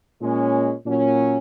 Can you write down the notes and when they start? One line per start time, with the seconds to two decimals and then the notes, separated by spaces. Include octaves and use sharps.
0.20 A#2 G#3 C#4
0.85 A#2 F#3 C#4